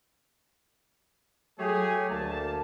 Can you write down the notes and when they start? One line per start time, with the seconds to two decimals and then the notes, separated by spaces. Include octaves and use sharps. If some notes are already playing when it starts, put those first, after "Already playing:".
1.59 F#3 A3 G4 G#4 C#5
2.11 D2 A#3 A5